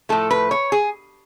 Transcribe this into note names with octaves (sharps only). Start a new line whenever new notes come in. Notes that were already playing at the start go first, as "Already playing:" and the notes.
A2 F3 A3 A4
B4
C#5
G#4